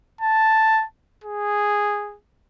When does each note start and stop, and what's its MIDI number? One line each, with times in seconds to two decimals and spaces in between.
0.21 0.84 81
1.24 2.17 68